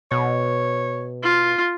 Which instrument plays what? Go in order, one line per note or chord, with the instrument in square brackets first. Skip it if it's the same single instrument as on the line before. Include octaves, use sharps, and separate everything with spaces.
[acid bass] B2 [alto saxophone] C#5
[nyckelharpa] F4